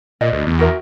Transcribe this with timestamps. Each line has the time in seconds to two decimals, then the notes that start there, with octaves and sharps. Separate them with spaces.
0.21 A#2 D5 D#5
0.33 D2
0.47 E2
0.59 F#4 A#4 E5